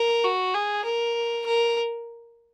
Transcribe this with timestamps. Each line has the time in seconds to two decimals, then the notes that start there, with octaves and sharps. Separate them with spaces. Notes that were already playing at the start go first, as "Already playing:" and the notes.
Already playing: A#4
0.25 F#4
0.54 G#4
0.85 A#4
1.46 A#4